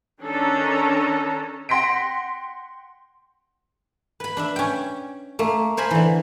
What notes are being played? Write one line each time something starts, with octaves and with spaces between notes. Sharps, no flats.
D#3 C#4 D4 A4 A#5
F#5 G5 C6 A#6 B6 D7
B4 B5
D4 B4 E5
C#4 G5
A3 A#3
A#4 C5 G#5 B5
D3 E3